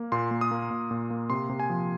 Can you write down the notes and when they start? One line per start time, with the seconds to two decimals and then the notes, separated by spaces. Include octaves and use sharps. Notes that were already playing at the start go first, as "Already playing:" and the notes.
Already playing: A#3
0.12 A#2 C6
0.31 A#3
0.41 D#6
0.51 A#3
0.71 A#2
0.91 A#2
1.10 A#3
1.30 C3 C6
1.49 C3
1.60 G#5
1.70 F3